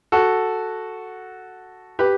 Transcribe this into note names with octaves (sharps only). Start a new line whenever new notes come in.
F#4 A4
G4 B4